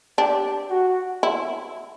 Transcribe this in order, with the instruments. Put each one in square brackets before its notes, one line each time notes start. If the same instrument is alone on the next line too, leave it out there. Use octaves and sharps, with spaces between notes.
[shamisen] D4 [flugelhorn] G4
[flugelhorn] F#4
[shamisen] E4